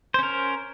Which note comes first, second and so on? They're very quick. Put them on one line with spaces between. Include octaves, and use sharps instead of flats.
C5 C#4 A#4